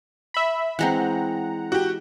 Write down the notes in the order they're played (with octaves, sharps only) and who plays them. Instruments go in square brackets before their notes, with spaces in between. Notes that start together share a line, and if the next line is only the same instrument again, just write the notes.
[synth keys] E5 B5
[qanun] E3 G#3 C4 [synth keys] F#5 A#5
[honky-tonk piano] F#4 G4